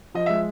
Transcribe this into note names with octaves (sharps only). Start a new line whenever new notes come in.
F3 D#5
G#3 E5